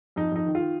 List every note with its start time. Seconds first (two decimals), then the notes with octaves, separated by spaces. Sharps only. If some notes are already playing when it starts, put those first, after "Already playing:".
0.16 F2 D#4
0.32 F2 D#4
0.46 D#3
0.55 F4
0.60 D#3